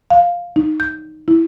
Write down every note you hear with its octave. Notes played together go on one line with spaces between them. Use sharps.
F5
D#4
G6
E4